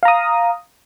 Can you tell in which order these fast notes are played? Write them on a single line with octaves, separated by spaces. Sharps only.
F5 A#5 D#6